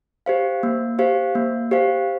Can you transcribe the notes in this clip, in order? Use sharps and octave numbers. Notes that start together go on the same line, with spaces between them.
G4 C5 F5
A#3
G4 C5 F5
A#3
G4 C5 F5